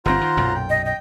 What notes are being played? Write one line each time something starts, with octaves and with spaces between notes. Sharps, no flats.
G1 D3 C4 F4 C5 F#5 A#5
D#3
B1 F#2 A#2
G5
D#5
D#5 G5